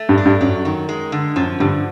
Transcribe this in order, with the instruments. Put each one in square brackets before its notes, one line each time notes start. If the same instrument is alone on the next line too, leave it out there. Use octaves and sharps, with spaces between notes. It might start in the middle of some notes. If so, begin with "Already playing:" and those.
Already playing: [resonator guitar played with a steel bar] A3
[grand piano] G2
[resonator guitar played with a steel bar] D4
[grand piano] G2
[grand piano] F#2 [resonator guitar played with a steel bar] F#3
[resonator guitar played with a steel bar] D#3
G#3
D3
[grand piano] F#2 [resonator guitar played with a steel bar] F3
[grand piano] G2 [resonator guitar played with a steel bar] D3